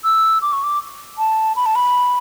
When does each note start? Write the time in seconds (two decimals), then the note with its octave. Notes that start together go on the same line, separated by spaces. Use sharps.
0.04 E6
0.42 D6
0.53 C#6
0.63 D6
1.18 A5
1.56 B5
1.66 A5
1.75 B5